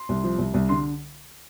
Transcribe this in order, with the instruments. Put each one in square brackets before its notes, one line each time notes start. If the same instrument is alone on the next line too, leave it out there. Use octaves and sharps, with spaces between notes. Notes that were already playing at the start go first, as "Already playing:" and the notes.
Already playing: [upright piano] C6
C2
F3
C2
C2
D3 C6